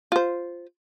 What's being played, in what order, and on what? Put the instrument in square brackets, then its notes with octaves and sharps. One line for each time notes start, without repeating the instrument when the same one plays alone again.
[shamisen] F4 C5